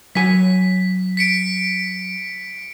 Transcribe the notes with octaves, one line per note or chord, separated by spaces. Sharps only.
F#3 C#5 G#5 B6
B6 C#7 D7